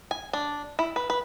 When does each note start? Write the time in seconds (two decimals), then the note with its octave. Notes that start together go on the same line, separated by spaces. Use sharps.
0.11 G#5
0.33 D4
0.79 E4
0.96 B4
1.10 B4